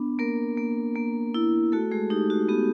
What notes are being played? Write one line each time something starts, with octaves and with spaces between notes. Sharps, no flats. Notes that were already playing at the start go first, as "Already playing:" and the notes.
Already playing: B3 D4
A#3 A#4
A#3
A#3
E4
A3 F#4 A4
G#3 G#4
D#4 G4
F#4
B3 G4